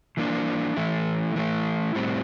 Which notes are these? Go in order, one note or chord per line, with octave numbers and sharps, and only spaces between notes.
E3 A#3 D4
E3 A3 E4
E3 A3 E4
A2 G3 C4